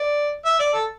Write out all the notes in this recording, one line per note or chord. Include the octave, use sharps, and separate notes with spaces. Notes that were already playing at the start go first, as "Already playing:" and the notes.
Already playing: D5
E5
D5
A4